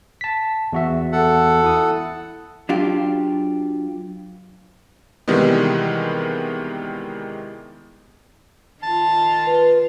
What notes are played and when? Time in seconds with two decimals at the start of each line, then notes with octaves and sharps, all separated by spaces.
0.21 A5 B6
0.73 E2 F#4 E5
1.12 A4 F#5
1.64 E4 D#6
2.69 F#3 D4 F4 G4
5.28 C3 D#3 E3 G3 G#3 B3
8.83 D#3 F4 A5
9.46 B4